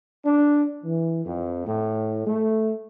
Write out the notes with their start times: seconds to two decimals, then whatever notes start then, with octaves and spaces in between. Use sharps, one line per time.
0.25 D4
0.83 E3
1.26 F2
1.66 A2
2.27 A3